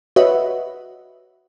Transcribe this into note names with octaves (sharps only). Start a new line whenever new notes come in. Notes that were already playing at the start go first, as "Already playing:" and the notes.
F#4 B4 C#5 D#5 E5 F#5